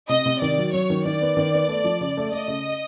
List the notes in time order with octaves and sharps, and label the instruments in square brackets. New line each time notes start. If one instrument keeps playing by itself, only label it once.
[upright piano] C3 [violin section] D#5
[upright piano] C3
[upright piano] D#3 [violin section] D5
[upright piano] F#3
[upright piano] F#3 [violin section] C#5
[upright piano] D#3
[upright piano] D#3 [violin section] D5
[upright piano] B3
D#3
B3
A3
F3
C#3
A3
[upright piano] A3 [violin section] D#5
[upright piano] C#3